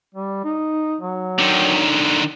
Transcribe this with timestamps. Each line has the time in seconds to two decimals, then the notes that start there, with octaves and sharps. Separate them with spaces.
0.15 G3
0.44 D#4
1.01 F#3
1.39 D3 D#3